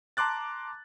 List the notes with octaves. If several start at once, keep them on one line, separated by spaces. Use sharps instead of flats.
A5 A#5 C6 D6 F#6 A6